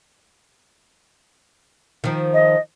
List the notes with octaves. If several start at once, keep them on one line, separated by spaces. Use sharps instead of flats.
D#3 F3
D#5